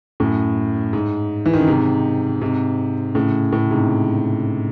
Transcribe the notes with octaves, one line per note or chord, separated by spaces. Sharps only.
F#2 A2
G#2
E3
D#3
C#3
G#2 C3
G#2 C3
A2 C#3
A2 C#3
G#2 C3